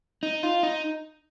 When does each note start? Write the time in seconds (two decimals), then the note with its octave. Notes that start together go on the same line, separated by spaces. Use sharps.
0.23 D#4
0.43 F4
0.63 D#4